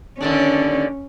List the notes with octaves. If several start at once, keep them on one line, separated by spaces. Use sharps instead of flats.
D#2 D3 C#4 D4